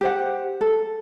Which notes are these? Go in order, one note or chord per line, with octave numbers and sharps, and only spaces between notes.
G4 C5 F#5
A4